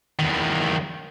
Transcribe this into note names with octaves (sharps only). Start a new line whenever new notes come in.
E2 D#3